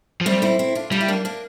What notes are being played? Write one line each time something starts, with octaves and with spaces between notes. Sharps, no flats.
F3
G3 A3 C4
C4 E4
C4 E4
D4 F4
G3 D4 F4
E4
A#3 D4
A#3 D4